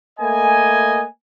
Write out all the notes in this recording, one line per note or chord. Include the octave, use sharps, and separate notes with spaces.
A3 A#3 B4 D#5 G#5